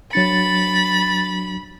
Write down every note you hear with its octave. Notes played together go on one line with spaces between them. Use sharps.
F#3 D4 B5 A6 C#7